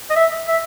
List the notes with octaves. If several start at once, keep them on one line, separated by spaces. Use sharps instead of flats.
D#5
E5
E5